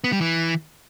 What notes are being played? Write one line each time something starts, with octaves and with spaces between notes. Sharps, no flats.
B3
G3
E3